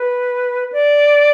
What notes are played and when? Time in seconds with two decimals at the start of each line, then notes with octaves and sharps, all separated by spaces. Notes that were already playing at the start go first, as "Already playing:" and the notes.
Already playing: B4
0.73 D5